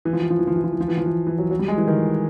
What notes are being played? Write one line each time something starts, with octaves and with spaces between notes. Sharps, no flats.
E3
F3
E3
F3
E3
F3
E3
F3
E3
F3
E3
F3
E3
E3
F#3
F#3
G3
G#3
E3
D#3